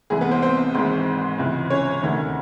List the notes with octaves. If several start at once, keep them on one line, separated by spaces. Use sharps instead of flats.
C2 C3 E3 G#3 G#4
B3 B4
C4 C5
C4 C5
G#1 G#2 E3 C4 C5
C#2 C3 E3
C#4 C#5
D2 C3 D#3